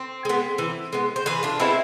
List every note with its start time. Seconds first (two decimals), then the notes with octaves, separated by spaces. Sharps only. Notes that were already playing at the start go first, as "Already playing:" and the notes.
Already playing: C4
0.25 G#3 B3
0.58 E3
0.93 G#3 B3
1.16 C5
1.26 E3 G#4 B4
1.43 D4 F4
1.60 G#3 B3 C4 E4